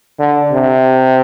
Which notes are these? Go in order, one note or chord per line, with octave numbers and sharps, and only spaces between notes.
D3
C3